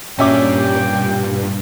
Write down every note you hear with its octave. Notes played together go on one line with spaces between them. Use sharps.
G2 A#2 C#4 G4 D5 E5 G5 D6